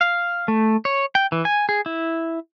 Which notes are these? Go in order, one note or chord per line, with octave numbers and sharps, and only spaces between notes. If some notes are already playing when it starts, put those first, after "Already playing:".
F5
A3
C#5
G5
E3
G#5
G#4
E4